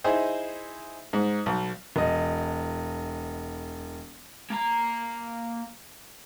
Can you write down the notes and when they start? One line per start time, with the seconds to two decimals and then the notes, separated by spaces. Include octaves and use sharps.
0.04 D#4 E4 G#4 C5
1.13 G#2
1.46 B1
1.96 E1 D#5
4.50 A#3 A#5